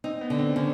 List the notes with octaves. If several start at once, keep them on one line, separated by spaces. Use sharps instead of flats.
C4 D#4
B3
D3
C4
D3 C#4